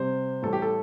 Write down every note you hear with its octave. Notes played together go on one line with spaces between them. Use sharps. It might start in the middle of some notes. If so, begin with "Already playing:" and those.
Already playing: C3 G3 C5
A2 E3 G3 A4
G4
A4